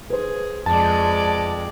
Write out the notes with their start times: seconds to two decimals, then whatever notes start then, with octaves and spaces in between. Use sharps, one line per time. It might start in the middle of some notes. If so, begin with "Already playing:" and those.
0.10 G#4 B4 C5
0.66 F2 G#3 D5 A5